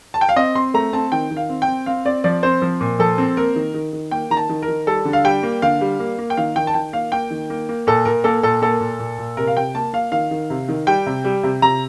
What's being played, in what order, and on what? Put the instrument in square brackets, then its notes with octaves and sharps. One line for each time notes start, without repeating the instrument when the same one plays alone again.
[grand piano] A5
G5
F5
C4 D#5
C4 C6
A3 A#5
C4 A5
D#3 G5
D#3
F5
C4
G5
C4
C4 F5
C4 D5
F3 D5
C4 C5
F3
A#2
F3 A4
C4
A#3 A#4
D#3
D#3
D#3
A#3 G5
D#3 A#5
A5
D#3
A#4
D#3
G3 A4
D3
F5
G3 G5
A#3
D3 F5
G3
A#3
A#3
G5
D#3 F5
D#3 G5
A5
D#3 G5
A#3 F5
A#3 G5
D#3
A#3
A#3
A#2 A4
A#2 A#4
A#3 A4
A#2 A4
A#3 A4
A#2
A#2
A#2
C3 A#4
F5
C3 G5
A#3 A5
A#3 F5
D#3 F5
D#3
C3
D#3
G3 G5
C3
G3
C3
C3 A#5